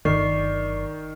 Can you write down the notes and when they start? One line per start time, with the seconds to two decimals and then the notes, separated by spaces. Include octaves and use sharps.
0.05 G1 D#3 F#3 D5 C#6 C7